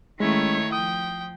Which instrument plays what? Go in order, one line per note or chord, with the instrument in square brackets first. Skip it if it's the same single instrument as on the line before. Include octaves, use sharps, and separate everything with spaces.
[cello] D#3 A3 [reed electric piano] G#3 C#4 [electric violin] E4 C#5
[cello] F3 [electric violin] G5 [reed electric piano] D#6